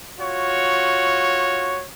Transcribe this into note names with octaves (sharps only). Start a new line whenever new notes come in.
F4 F#4 C#5